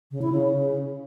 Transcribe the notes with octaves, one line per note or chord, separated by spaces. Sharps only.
C#3
E4
C#3